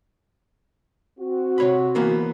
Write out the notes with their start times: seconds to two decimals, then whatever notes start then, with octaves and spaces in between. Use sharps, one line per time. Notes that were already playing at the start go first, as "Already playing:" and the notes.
1.19 C4 F#4
1.58 C3 C#5 B5
1.95 E3 A#3 B3